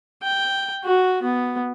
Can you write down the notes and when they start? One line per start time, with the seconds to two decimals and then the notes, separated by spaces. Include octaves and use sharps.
0.22 G5
0.85 F#4
1.23 B3